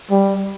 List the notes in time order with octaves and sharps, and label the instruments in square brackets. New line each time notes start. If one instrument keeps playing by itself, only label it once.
[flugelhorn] G3